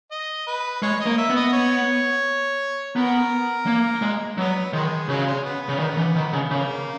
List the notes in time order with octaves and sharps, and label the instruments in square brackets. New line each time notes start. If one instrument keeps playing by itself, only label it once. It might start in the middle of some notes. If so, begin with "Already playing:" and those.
[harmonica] D#5
B4
[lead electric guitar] G#3 [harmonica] C#5
[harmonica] D#5
[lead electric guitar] A#3
[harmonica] E5
[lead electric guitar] B3
[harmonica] D#5
C#5
[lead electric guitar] B3 [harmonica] A#4
[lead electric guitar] A#3
G#3
[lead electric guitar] F#3 [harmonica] B3
[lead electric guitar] D#3 [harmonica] G#3
[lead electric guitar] C#3 [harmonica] F#3
[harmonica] G#3
B3
B3
[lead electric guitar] C#3
D#3
E3
D#3
C#3
[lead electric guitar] C#3 [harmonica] A#3